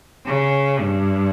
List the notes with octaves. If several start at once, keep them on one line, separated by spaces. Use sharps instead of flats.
C#3
G2